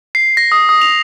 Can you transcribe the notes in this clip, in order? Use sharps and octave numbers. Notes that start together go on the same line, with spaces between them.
C7
A#6
D#6
D#6
F7